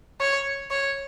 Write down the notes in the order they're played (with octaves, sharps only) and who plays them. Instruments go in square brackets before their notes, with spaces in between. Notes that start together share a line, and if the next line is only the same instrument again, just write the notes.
[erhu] C#5
C#5